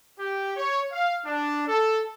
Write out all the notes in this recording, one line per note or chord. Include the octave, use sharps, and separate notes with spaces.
G4
C#5
F5
D4
A4